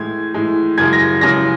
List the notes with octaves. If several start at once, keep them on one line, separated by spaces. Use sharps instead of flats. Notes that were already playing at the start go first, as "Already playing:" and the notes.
Already playing: A2 E3 G#3 G#6
A2 E3 G#3
F#2 C#3 E3 G#3 G#6
A#6
F#2 C#3 E3 G#3 A#6